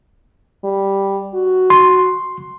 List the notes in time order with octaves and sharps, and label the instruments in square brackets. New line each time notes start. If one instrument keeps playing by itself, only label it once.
[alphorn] G3
F#4
[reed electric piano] C6